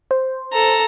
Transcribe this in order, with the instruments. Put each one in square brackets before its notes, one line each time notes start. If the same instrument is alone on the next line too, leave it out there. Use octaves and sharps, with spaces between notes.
[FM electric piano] C5
[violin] A4 A#5